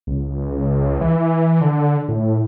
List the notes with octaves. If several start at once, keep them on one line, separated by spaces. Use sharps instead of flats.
C#2
E3
D3
A2